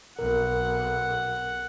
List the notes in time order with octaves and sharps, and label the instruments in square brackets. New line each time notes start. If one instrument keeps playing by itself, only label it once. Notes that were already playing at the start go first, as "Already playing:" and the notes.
[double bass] B1 [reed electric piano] A#4 [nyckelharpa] F#5